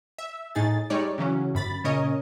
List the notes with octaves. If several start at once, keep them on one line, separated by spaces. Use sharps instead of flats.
E5
A2 D#4 G#4 A6
G3 G#3 D#4 C#5 D5
C#3 E3 F#3 C#4
G1 F#2 B5 A6
A#2 C#3 C#4 A#4 C#5 D#5